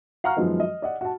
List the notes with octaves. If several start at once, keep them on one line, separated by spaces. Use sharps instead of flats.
F5 F#5 A#5 C#6 F6
F#2 D#3 F3 F#3 G#3 B3
D#5
D5 D#5 F#5
F#4 A5